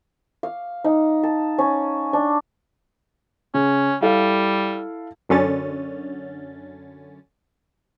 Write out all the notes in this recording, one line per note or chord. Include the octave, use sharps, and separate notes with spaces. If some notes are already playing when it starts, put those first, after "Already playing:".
F5
D#4
A5
C#4
D4
C#3 C#4
G3 E4 A4 F5
F#2 D3 C#4 A6